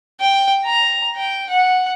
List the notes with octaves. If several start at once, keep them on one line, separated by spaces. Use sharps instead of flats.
G5
A#5
G5
F#5